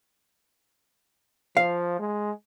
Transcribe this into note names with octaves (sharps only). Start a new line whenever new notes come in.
F3 F5
G#3